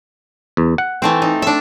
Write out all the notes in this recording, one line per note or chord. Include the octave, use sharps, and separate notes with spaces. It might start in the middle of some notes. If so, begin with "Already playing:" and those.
E2
F#5
E3 A3 C4
D#4
D4 E5